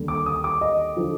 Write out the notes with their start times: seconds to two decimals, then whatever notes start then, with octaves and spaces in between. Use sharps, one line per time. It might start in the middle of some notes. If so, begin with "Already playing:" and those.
Already playing: D#2 D3 G3
0.08 D6
0.26 D#6
0.44 D6
0.61 D#5
0.97 D3 F3